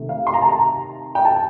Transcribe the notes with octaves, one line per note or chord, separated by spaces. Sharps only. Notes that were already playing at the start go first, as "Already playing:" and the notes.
Already playing: C3 D#3 A3
F5
C6
A#5
A5
A#5
G5
A5